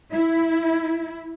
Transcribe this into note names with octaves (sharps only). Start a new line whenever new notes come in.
E4